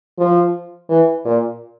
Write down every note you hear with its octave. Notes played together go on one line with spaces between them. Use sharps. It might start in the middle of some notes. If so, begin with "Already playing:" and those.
F3
E3
A#2